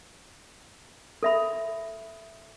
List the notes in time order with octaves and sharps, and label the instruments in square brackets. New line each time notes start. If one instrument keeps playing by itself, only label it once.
[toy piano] A4 E5 B5